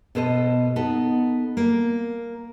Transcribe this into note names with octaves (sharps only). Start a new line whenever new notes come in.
B2 B3 A4 C5 D#5
B3 D#4 A4
A#3